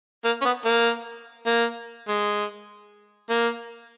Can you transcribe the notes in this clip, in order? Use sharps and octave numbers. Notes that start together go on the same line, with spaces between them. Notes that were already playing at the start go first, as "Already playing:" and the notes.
A#3
C#4
B3
A#3
A#3
G#3
A#3